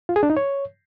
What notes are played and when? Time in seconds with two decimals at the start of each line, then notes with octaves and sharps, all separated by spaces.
0.09 F4
0.16 G#4
0.23 D4
0.30 D#4
0.37 C#5